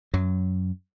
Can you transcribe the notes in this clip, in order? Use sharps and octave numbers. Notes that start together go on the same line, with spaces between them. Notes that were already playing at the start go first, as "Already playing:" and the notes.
F#2 F#3